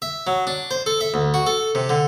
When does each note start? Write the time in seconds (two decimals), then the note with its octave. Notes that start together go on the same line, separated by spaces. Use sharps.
0.02 E5
0.27 F#3
0.47 D4
0.71 C5
0.86 A4
1.01 E5
1.14 D2
1.34 F#4
1.46 A4
1.75 C3
1.89 D3